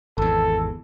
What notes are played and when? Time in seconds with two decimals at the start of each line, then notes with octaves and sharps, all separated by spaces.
0.18 G#1 E2 A4